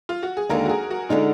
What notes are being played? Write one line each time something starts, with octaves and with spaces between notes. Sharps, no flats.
F4
F#4
G#4
D#2 D3 G#3 D#4 A#4
F#4
G#4
F#4
D3 G#3 D#4 F4